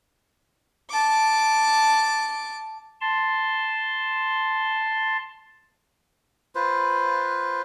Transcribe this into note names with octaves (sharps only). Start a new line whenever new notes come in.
A5 D6
A5 C6
F4 B4 C5